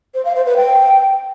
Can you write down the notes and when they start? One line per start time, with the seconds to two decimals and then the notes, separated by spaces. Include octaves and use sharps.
0.15 C5
0.25 F5
0.36 C5
0.46 B4
0.57 G5